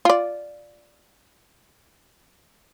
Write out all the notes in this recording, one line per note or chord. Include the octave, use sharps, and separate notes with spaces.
F4 D5